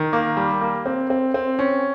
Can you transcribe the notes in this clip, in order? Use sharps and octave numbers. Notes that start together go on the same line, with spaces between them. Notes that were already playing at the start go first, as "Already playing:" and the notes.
Already playing: D#3
A#3
G3
A#3
C4
C4
C4
C#4